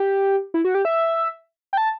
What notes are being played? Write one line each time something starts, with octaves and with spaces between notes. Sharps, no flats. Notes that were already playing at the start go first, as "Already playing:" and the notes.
Already playing: G4
E4
F#4
G4
E5
G5
A5